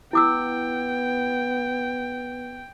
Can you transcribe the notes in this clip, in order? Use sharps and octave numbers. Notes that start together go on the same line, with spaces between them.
B3 E4 G5 D6 E6